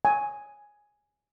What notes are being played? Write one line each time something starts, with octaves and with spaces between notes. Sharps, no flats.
G#5